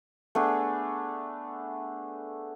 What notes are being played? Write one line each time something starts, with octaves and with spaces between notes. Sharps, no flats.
A3 B3 D4 G#4